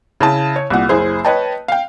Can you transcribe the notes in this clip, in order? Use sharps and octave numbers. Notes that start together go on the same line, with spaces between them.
C#3 E4 A5
C#5
C2 A#2 F#5
F#1 E4 G#4 C5
B4 C#5 D#5 G5 A5
F5 G5